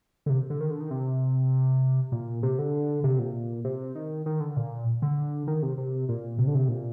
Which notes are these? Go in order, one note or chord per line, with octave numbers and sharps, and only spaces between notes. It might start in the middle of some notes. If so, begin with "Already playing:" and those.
D3
C3
D3
D#3
D3
D#3
C3
A#2
C3
D3
C3
A#2
C3
D#3
D#3
D3
A#2
D3
D#3
C3
C3
A#2
C3
D3
C3
A#2